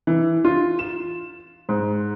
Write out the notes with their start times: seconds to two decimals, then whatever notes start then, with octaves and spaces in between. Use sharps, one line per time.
0.07 E3
0.45 F4
0.79 E7
1.69 G#2